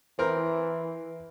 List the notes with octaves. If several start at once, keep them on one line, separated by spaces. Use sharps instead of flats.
E3 C4 A#4